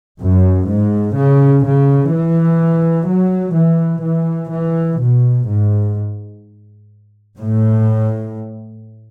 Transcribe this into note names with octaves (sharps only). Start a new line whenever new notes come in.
F#2
G#2
C#3
C#3
E3
F#3
E3
E3
E3
B2
G#2
A2